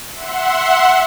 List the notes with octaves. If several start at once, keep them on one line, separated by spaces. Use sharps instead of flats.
E5 F#5 C6